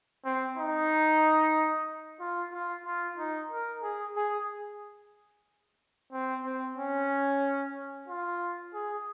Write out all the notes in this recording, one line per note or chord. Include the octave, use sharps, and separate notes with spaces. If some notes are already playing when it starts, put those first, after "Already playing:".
C4
D#4
F4
F4
F4
D#4
A#4
G#4
G#4
C4
C4
C#4
F4
G#4